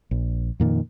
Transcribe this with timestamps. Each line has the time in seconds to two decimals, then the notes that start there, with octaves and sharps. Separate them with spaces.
0.11 A#1
0.60 F2 A#2 D#3